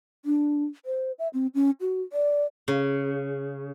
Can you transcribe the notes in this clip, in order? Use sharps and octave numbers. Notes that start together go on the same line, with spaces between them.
D4
C5
E5
C4
C#4
F#4
D5
C#3